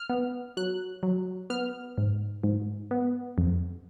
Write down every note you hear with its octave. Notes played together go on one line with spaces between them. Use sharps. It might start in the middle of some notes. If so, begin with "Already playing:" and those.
Already playing: F6
B3
F#3 F#6
F#3
B3 F6
G#2
G#2
B3
F2